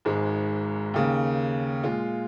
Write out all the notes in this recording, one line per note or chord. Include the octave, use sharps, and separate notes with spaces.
G#1 G#2 G#3
D#2 C#3 A#3
A#2 G#3 F4